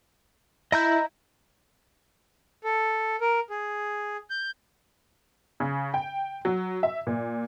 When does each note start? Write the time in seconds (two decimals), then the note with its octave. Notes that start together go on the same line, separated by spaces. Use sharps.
0.72 E4 D#5 A#5 G6
2.64 A4
3.21 A#4
3.50 G#4
4.30 G6
5.60 C#3
5.94 G5
6.45 F#3
6.83 E5
7.07 A#2